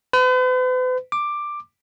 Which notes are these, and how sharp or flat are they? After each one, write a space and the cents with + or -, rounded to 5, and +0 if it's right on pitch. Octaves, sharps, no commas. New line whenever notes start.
B4 +45
D6 +10